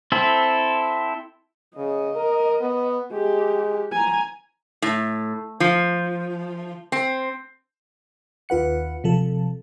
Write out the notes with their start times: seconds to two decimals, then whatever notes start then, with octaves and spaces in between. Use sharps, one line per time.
0.12 C4 E4 A4
1.77 C#3 D#5
2.15 A#4
2.61 B3
3.12 G#3 G4
3.92 G#5 A#5
4.82 A2
5.60 F3
6.92 C4
8.49 D#2 F4 B4 F#5 C#7
9.04 C3 F3 A4